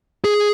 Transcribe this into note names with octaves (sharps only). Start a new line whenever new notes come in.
G#4